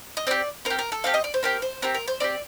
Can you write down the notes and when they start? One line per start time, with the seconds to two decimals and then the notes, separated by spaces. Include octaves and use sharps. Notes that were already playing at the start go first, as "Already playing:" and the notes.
0.17 D#5
0.27 C4 G4 D5
0.65 C4 A#4
0.70 G4
0.79 A#4
0.92 A4
1.04 C4 G4 F5
1.14 D#5
1.24 D5
1.34 C5
1.43 C4 G4 A#4
1.62 C5
1.82 C4 G4 A#4
1.94 A#4
2.08 C5
2.20 C4 G4 D5